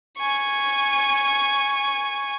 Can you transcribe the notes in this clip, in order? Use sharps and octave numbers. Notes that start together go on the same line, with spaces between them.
G#5 C#6